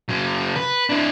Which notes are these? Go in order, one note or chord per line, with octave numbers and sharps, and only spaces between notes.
C#3 F#3
B4
D4 E4